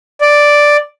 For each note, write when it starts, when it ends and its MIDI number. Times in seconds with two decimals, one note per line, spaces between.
0.21 0.77 74